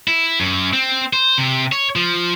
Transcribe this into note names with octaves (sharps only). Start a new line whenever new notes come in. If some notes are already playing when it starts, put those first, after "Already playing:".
E4
F#2
C4
C5
C3
C#5
F3